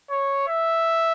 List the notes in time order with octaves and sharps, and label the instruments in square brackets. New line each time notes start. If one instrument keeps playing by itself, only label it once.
[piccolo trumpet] C#5
E5